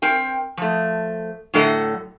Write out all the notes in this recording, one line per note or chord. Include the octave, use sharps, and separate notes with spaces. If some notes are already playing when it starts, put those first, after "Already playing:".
C4 A#4 G5
F3 A3
A2 D3 F#3 A4 D#5 F#5